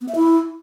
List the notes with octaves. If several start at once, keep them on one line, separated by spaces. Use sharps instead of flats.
B3
E5
E4